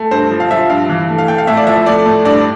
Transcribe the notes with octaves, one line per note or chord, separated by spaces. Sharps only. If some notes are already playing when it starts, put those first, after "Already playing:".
Already playing: A3
G2 C5
F3
F5
F3 E5
G2 F5
E3
A3
F5
A3 G5
F5
A2 E5
D5
F3 E5
A3 D5
A2
G2 D5